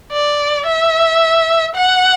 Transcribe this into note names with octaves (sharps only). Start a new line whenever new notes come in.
D5
E5
F#5